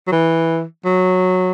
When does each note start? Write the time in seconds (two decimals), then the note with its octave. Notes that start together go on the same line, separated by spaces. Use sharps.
0.07 F#3
0.12 E3
0.85 F#3